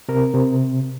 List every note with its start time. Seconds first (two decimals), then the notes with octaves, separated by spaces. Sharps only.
0.08 C3 A#4
0.34 C3